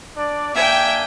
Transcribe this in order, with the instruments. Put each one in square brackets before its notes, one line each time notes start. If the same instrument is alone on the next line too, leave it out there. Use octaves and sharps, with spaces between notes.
[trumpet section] D4 D5
[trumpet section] A#3 D4 G#5 [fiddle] E5 [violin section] G5